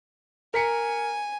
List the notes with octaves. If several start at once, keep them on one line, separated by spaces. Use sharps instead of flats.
A#4 G#5 B6 C#7